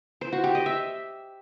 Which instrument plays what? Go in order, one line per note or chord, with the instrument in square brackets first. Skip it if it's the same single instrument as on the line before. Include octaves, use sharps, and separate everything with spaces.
[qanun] C5
F#4
G4
D#5
E5